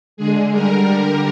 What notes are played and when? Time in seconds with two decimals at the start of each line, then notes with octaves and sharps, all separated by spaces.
0.17 D3 G#3 G#4
0.51 D3 G3 A#4